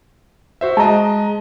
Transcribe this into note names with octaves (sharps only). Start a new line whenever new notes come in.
F#4 C5 E5
G#3 D#5 A5 A#5